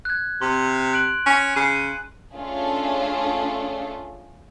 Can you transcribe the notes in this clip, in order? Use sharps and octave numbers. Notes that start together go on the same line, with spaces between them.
F#6 G#6
C3 C6
F#6 D7 F#7
C#4
C#3 D#7
A3 C#4 D4 F4 G#4 A4